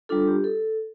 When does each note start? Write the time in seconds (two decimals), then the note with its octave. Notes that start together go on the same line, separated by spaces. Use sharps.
0.09 G3 D4 F4 A4
0.28 G4
0.44 A4